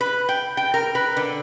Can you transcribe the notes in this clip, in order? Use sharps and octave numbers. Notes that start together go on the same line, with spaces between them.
B4
G5
G5
A#4
B4
D3